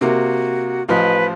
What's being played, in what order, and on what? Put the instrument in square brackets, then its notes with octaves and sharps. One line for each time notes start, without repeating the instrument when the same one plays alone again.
[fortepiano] C3 A#3 [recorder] F#4
[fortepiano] A1 F3 [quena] B4 [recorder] D#5